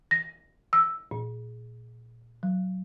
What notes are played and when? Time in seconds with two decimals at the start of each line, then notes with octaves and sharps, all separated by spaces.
0.11 A#6
0.73 E6
1.11 A#2
2.43 F#3